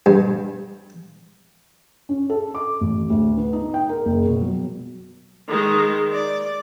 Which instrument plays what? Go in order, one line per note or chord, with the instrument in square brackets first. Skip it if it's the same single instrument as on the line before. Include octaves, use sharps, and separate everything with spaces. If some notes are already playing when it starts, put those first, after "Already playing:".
[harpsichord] G2
[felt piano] C#4
A4
D6
A1
D2
B3
D#4
G5
A#4
F#1
B2
F#3
[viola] D#3 G#3
D5